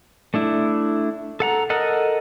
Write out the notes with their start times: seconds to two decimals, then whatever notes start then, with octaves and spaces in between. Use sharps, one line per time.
0.34 A3 D4 E4
1.40 A4 F#5 A#5
1.70 A4 A#4 D#5 F#5